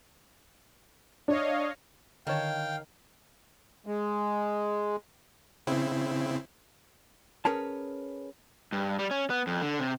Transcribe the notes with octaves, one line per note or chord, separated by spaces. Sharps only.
D4 C#5 D#5 F5
D3 D#3 C#5 F5 G5 A5
G#3
C#3 C4 E4
C#4 G#4 A#4 B4 C#5 A5
G2
G3
C#4
B3
F2
D3
C3